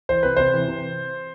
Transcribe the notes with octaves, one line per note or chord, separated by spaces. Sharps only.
E3 C5
C3 B4
C3 C5
E3
C3